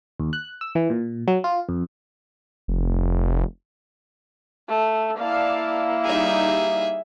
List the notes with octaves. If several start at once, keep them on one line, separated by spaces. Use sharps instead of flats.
D#2
F#6
E6
E3
A#2
F#3
F4
F2
F1
A3
A#3 E4 D5 F5 A5
G3 D#4 G#4 E5